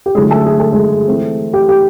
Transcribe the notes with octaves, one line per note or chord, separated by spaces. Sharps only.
G4
D3 F#3 G#3 A3 C#4 E4 G#4
A3 A4
G#4
A4
G#3 G#4
E3 A3 C4
G4
G4